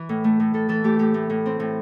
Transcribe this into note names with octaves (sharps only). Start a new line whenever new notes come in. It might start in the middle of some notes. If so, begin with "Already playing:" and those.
Already playing: E3
A2
A3
A2
A2 A4
E3 A4
A3 G4
A2 G4
A2
A2
C4
A2